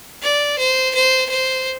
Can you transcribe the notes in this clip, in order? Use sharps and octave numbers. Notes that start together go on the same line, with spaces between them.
D5
C5
C5
C5